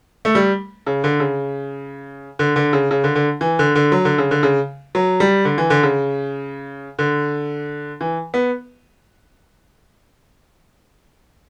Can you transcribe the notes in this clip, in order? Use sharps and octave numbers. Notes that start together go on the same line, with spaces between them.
A3
G3
C#3
D3
C#3
D3
D3
C#3
C#3
D3
D3
E3
D3
D3
F#3
D3
C#3
D3
C#3
F#3
G3
D3
E3
D3
C#3
D3
E3
B3